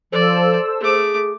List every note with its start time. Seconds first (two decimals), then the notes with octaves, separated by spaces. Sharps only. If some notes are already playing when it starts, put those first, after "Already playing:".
0.12 F3 A4 C5 D5 E6
0.80 A3 G#4 D6